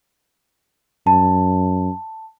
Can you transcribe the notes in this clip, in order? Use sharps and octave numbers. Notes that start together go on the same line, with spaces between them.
F#2 A5